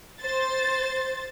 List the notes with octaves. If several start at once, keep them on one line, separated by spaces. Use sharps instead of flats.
C5 A6